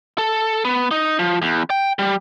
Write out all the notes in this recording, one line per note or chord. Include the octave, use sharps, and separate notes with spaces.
A4
B3
D#4
F3
E2
G5
G3